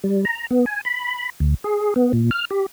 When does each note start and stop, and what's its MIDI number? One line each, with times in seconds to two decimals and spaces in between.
0.04 0.25 55
0.25 0.47 82
0.51 0.65 59
0.66 0.81 80
0.85 1.30 83
1.40 1.55 38
1.64 1.94 68
1.96 2.12 59
2.13 2.30 46
2.31 2.45 89
2.51 2.66 67